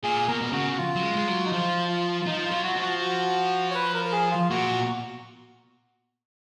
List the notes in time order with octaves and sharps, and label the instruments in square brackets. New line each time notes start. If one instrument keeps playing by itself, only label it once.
[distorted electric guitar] A#2 [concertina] G#4
[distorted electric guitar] B2 [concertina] A#4
[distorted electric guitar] B2
[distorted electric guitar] C#3 [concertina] F#4
[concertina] F#4
F4
[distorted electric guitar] F#3
G#3
G#3
F#3
[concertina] D#4
[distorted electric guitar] F3 [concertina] F4
[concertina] F4
F4
[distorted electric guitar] F3 [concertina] D#4
[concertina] F4
[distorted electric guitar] F#3
[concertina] F#4
[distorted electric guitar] F3
[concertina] F#4
F#4
C#5
B4
A#4
A#4
G#4
F4
[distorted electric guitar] A#2 [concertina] F#4